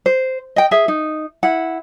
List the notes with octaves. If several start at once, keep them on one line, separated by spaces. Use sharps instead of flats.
C5
D#5 G5
G#4 E5
D#4
E4 F#5